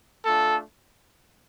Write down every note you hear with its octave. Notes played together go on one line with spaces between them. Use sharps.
A3 D4 F4 A4